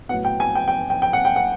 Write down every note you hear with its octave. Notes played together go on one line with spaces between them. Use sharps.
A2 F#3 B3 F#5
G5
G#5
G5
G5
G5
G5
F#5
G5
F#5